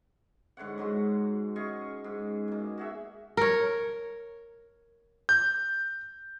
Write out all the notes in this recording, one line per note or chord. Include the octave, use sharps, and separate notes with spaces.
G#2 D3 C#5 F#5
G#2 F#3 G#3 F#4
C#4 G#4 D#5 C#6
G#2
B2 A#3
F#4 G#4 E5
A#4 C#5
G6